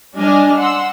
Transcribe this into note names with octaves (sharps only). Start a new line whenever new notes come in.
G3 D4 D#5 G#5 F6
F#5 C6 E6